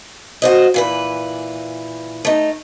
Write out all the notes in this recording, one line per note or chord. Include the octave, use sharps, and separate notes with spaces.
F#4 C5 D#5
A#2 E3 B4
A3 D#4